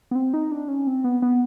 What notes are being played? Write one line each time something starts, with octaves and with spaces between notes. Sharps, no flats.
B3
C4
D#4
D4
C#4
C4
B3
B3